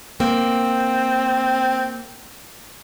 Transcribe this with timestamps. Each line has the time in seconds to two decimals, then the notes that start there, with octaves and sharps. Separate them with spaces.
0.20 A#3 C4